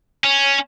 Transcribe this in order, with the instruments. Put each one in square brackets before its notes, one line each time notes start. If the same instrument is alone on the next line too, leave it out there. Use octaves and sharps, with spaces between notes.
[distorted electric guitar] C#4